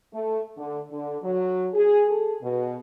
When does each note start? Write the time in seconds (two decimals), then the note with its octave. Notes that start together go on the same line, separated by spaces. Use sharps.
0.13 A3
0.57 D3
0.91 D3
1.22 F#3
1.74 G#4
2.08 A4
2.41 B2